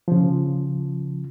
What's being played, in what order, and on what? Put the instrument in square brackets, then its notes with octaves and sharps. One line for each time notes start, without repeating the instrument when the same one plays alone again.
[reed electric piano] C#3 F3